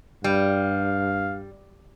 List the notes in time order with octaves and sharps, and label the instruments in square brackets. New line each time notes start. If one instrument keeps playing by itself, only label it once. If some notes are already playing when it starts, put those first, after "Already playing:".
[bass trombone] G2 [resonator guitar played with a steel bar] G3 [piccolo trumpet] F5